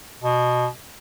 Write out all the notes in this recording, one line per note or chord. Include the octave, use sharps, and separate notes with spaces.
B2